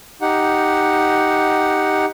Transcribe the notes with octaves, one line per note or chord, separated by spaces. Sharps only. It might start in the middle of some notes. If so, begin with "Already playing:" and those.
D#4 G4 F#5